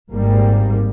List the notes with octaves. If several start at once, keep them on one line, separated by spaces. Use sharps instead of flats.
G#1 G#2 G3 A#3